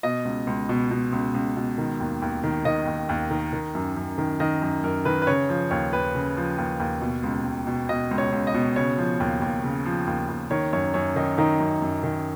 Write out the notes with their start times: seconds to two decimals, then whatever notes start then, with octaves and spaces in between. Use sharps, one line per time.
0.03 B2 D#5
0.25 C#2
0.47 C#2
0.69 B2
0.91 B2
1.13 C#2
1.35 C#2
1.56 B2
1.78 D#3
2.00 D#2
2.22 D#2
2.44 D#3
2.65 D#3 D#5
2.87 D#2
3.09 D#2
3.31 D#3
3.53 D#3
3.75 F#2
3.96 F#2
4.18 D#3
4.40 D#3 D#5
4.62 F#2
4.83 F#2 A#4
5.05 D#3 B4
5.22 B4
5.27 C#3 C#5
5.49 F3
5.71 D#2 C#5
5.93 D#2 B4
6.15 C#3
6.36 F3
6.58 D#2
6.80 D#2
7.01 B2
7.24 C#2
7.45 C#2
7.67 B2
7.89 B2 D#5
8.11 C#2
8.18 C#5
8.32 C#2
8.47 D#5
8.54 B2
8.76 C#3 C#5
8.98 F3
9.20 D#2
9.42 D#2
9.63 C#3
9.86 F3
10.07 D#2
10.29 D#2
10.51 D#3 C#5
10.73 F#2 C#5
10.94 F#2 C#5
11.16 D#3 D#4
11.38 D#3 D#4
11.60 F#2
11.82 F#2
12.03 D#3